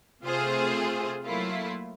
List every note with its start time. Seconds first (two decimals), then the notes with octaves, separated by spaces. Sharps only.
0.23 C3 A3 C4 F4 G#4 C5
1.24 F#3 A3 A#3 E4 F4